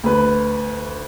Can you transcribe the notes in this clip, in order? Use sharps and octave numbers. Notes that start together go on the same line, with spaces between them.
D2 B4